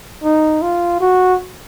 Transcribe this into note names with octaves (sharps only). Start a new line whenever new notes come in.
D#4
F4
F#4